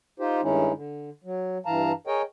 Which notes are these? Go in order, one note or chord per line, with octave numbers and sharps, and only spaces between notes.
D#4 F4 G4 C5
G2 D#3 G#3 C#4 D#4 E4
D3
F#3
G2 E3 F5 A5 A#5
G#4 A#4 C#5 D#5 G5